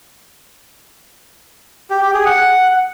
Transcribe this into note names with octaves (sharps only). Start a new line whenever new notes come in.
G4
G4
G#4
F#5